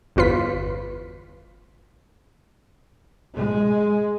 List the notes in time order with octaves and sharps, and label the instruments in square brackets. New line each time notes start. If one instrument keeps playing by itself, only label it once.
[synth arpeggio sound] G1 E2 F4 B4 B6
[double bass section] G#3